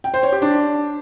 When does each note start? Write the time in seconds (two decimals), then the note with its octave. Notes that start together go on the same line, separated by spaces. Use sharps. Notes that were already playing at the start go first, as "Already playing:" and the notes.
0.04 G5
0.14 C5
0.23 C#5
0.32 G4
0.42 D4